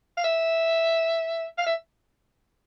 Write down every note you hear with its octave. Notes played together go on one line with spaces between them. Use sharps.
F5
E5
F5
E5